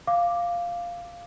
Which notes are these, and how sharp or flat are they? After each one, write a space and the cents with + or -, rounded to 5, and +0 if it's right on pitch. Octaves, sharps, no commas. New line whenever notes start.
F5 +0 D6 +0